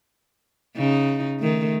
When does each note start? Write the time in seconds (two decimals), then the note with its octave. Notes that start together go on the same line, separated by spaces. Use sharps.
0.76 C#3 D#4
1.39 D#3 A3